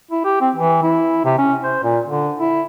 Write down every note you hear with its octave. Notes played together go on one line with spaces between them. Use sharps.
E4
G4
C4
E3
E4
C3
C#4
C5
A#2
D3
E4